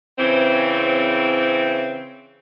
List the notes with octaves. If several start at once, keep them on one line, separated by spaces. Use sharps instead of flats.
C#3 E3 C4